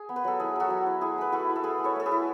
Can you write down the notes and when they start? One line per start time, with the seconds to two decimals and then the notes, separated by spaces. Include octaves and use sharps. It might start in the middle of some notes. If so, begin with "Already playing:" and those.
Already playing: G#4
0.09 B3
0.16 B4
0.25 F#3 A4
0.40 E4 G#4
0.56 F#3 F#4 A4
0.70 F#3
0.86 E4
1.01 E4 G#4
1.18 A3 B4
1.32 E4 F#4 A4
1.49 E4
1.56 A4
1.64 A3 G#4 B4
1.79 A3
1.84 A4 C#5
1.96 A3 A4
2.06 G#4 B4
2.11 E4